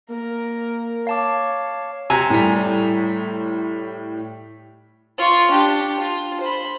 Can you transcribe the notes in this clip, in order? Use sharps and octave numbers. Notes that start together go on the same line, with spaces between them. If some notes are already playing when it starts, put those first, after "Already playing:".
A#3 A#4
C#5 F5 A5 D6
C3 G#5 A#5
A2 G3
F4 C#6
D4 G4
F4
C5 B5